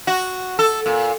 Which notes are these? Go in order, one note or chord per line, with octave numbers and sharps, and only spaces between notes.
F#4
A4
A#2